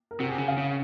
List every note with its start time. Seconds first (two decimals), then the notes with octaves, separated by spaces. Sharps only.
0.11 A#4
0.20 C3 F#4
0.29 G#4
0.38 C#3
0.48 F5
0.57 C#3